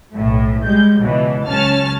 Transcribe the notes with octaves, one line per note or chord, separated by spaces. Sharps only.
B1 A2
G3 G#3 G6
C#2 B2 E3
C#2 F#3 C#4 A5 F6 A6